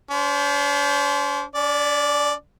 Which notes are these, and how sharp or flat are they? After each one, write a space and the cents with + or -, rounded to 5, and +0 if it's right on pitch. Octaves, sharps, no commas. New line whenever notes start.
D4 -45 C5 +0
C#4 +45 D5 +0